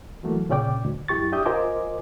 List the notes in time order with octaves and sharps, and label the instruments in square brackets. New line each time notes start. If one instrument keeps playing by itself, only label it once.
[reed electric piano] E3 F#3 A3 A#3
A#2 C#3 C#4 D5 G5 D6
D2
F#2 E4 G4 C#6 A6
D4 G4 E5 D#6 G6
F4 A#4 C5 D#5 G#5 D6